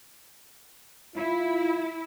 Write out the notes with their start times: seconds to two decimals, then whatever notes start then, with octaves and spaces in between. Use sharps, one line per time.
1.16 E4 F4